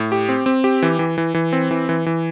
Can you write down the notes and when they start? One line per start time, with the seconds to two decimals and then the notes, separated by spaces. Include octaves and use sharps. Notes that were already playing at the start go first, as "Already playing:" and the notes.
Already playing: A2
0.12 G4
0.29 C4
0.46 C4
0.64 G4
0.82 E3
0.99 E3
1.18 E3
1.34 E3
1.53 C4
1.71 E3
1.89 E3
2.06 E3